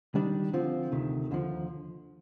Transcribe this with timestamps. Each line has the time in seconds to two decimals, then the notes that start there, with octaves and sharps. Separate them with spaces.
0.15 D#3 G3 D4
0.53 D3 F3 C4 F4
0.92 D2 C3 D#3
1.31 D#2 D3 F3